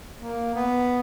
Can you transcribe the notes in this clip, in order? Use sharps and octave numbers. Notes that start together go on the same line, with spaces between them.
A#3
B3